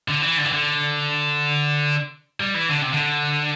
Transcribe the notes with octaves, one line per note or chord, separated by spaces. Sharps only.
D3
E3
D3
E3
D3
G3
E3
D3
C3
D3